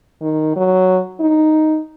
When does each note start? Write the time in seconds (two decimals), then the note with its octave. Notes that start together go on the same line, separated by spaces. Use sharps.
0.22 D#3
0.56 F#3
1.20 D#4